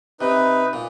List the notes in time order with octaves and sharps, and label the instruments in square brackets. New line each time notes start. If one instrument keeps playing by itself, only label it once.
[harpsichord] C3 [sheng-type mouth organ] D#4 B4
[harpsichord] A#2